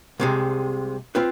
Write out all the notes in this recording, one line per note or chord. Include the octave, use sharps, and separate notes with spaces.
C2 C3 G#3
C4 F4 B4